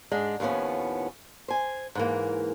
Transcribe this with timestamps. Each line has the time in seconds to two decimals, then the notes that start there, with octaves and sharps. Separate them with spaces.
0.12 G#2 G#3 D4
0.40 D#2 A2 F3 B3 C#4
1.48 C5 G#5
1.95 G#2 E3 A#3